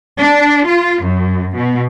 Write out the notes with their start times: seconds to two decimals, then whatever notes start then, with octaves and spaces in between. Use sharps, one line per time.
0.21 D4
0.69 F4
1.06 F#2
1.57 B2